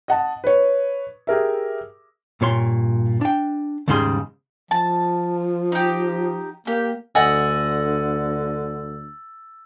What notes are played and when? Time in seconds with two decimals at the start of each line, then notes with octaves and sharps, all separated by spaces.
0.08 D#5 F#5 A5
0.44 B4 C#5
1.27 G4 G#4 A#4 E5
2.41 G2 A#2 C#5 C6
3.21 D4 G5
3.88 D#2 G#2 C#3 G3 G#4 C6
4.71 F3 A5
5.72 D#4 G4
6.67 A#3 G4
7.15 D2 D3 D#5 F#5 G#5 E6 A6 F#7